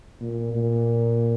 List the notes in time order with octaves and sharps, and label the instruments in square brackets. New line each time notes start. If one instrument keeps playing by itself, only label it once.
[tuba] A#2
A#2